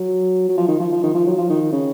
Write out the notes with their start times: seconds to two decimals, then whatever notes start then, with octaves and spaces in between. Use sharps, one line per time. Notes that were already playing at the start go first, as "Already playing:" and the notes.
Already playing: F#3
0.49 F#3
0.57 F3
0.68 D#3
0.80 F3
0.91 F3
1.03 D#3
1.14 F3
1.26 F#3
1.37 F3
1.49 D#3
1.72 C#3